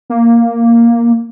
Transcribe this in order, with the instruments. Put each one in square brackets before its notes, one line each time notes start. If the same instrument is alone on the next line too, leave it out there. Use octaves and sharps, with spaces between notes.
[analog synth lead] A#3